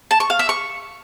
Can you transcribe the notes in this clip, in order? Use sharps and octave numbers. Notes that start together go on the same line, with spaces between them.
A5
C#6
F5
E5
C#6